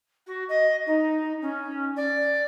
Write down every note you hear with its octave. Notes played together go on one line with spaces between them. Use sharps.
F#4
D#5
D#4
C#4
D5